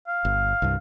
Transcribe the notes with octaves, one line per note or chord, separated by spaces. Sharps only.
F5
G1
C2 G2